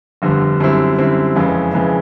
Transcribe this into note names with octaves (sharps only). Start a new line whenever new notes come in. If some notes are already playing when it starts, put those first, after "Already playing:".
G1 F2 D3 G3
F#2 D3 G3 C4 E4
F#2 D3 G3 C4 E4
F#1 F2 C#3 E3 G#3
F#1 F2 C#3 E3 G#3